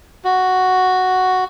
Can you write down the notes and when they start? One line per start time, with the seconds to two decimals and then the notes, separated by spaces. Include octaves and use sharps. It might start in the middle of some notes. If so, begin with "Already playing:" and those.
0.24 F#4